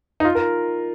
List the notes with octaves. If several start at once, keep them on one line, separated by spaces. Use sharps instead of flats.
D#4
F4
A#4